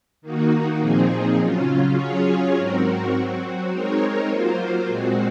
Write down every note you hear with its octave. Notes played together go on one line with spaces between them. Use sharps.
D#3 A#3 D#4 F#4
A#2 F3 C4 D#4 G#4
C#3 F#3 C#4 F4
F#3 C#4 F4 G#4 C#5
G#2 F#3 C4 F#4 A#4
F#3 C4 F#4
G#3 C4 D#4 A#4 C#5
F#3 A#3 F4 C5
A#2 G#3 C4 F#4